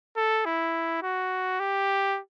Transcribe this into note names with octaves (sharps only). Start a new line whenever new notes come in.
A4
E4
F#4
G4